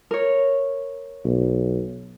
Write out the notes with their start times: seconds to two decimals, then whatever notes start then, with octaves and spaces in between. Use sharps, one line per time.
0.11 A#4 C#5
1.25 B1